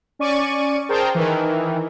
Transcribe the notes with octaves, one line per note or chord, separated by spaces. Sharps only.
C#4 D5 C#6 D#7
G#4 A#4 C5 G5 A5
D#3 E3